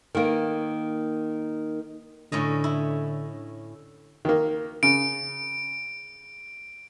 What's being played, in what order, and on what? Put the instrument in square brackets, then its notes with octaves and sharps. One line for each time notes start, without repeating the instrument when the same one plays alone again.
[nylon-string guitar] D#3 A#3
[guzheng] A2 C#4 D#5 [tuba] D3
[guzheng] E4
[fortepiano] D#3 A#3
[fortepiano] C#3 [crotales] D7